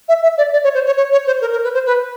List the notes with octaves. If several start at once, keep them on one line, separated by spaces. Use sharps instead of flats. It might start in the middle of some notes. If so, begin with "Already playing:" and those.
E5
E5
D5
D5
C#5
C5
C#5
C#5
C#5
C5
A#4
A#4
B4
C5
B4